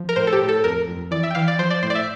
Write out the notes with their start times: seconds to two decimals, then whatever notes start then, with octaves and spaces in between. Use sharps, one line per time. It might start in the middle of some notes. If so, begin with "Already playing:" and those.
Already playing: F3
0.09 A#4
0.16 A2 C5
0.27 A4
0.32 G4
0.41 A2
0.49 A4
0.64 F2 A#4
0.88 F2
1.11 E3 D5
1.23 E5
1.31 G5
1.35 E3 F5
1.48 D5
1.59 F3 C5
1.70 D5
1.83 A2 C5
1.90 D5
1.95 E5